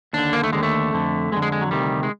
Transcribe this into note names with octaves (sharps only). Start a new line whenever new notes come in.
D#2 D3 D4
A#3
A3
D#2 D3 G#3
A3
F2 D3
F2 G#3
D3
G#3
G#3
F#3
D2 C3 D#3 G3
G#3